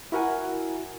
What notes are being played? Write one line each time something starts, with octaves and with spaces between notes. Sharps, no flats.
E4 F#4 A#4 F#5 G#5